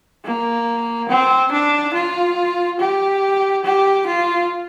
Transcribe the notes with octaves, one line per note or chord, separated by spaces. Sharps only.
A#3
C4
D4
F4
G4
G4
F4